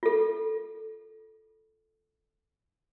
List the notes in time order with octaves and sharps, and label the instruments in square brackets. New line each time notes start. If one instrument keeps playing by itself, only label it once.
[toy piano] F4 A4